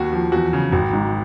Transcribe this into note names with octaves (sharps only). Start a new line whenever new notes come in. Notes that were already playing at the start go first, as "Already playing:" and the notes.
Already playing: D#2 F#4
F3
E2 F#4
C#3
G#1 F#4
G#2